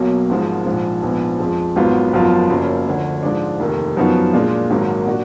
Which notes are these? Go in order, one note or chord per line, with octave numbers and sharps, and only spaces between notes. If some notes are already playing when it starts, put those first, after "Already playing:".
Already playing: B1 B2 F#3 A#3
G#1 G#2 F3 G#3
A#1 G#2 F3
A#1 G#2 F3 B3
F2 F3 G#3
G#1 G#2 F#3 B3 F4
G#1 F#2 F3 B3 F4
F#1 F#2 F3 A#3
D2 D3 F3
G#2 F3 G#3 D4
F1 D#2 D#3
F#2 F3 B3 D#4 F#4
A#2 G#3 D4 F4
G#1 G#2 D#3 F#3 A#3
A#2 F#3 A#3 D4 F#4